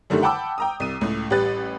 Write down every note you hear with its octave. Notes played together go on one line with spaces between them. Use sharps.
F#2 D3 D#3 G3 A3
F#5 G5 A5 B5 D6 E6
G5 A#5 D#6
C2 D#7
C#2 A2
A1 G3 G4 B4 F#6 A6